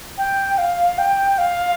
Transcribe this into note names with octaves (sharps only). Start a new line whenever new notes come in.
G5
F5
G5
F5